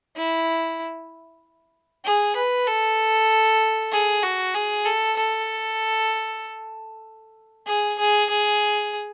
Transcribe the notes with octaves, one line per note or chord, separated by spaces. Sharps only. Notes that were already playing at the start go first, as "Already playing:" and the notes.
E4
G#4
B4
A4
G#4
F#4
G#4
A4
A4
G#4
G#4
G#4